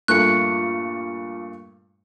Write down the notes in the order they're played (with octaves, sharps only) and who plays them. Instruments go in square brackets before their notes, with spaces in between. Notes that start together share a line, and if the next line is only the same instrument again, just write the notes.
[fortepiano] G2 A#2 A3 [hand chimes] F4 F5 [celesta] C#6 C#7 [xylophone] F#6